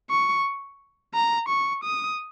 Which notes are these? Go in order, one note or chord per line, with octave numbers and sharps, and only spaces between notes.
C#6
A#5
C#6
D#6